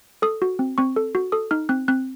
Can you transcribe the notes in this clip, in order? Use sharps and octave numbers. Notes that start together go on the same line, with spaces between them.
A4 D#6
F#4
C4
C4 C#6
A4
F#4
A4 D#6
D#4 F6
C4 F#6
C4 F#6